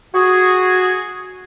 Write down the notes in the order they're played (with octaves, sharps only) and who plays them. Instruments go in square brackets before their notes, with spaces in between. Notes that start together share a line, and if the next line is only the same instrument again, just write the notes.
[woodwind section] F#4 G#4